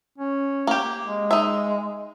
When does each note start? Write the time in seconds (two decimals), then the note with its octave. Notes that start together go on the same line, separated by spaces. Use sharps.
0.18 C#4
0.67 A#3 G4
1.06 G#3
1.31 D#4 E5